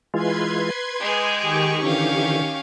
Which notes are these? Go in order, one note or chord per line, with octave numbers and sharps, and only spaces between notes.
E3 G#3 F4 B4 C6 G#6
G#3 G#4 G5 G#5 D6
D#3 G4 C#6
D3 E3 C#4 F5